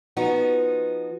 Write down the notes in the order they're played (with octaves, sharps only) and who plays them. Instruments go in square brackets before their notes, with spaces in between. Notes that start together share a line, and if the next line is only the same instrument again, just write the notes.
[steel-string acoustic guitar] F3 B3 D#4 F#4